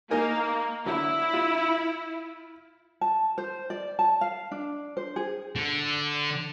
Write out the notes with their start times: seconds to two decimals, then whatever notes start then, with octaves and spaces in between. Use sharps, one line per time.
0.11 A#3 D#4 A#4 G#5
0.86 D3 F#3 E4
1.33 F4
3.01 A5
3.38 C5
3.70 D5
3.99 A5
4.21 F5
4.51 D4
4.97 C5
5.16 G#4
5.56 D3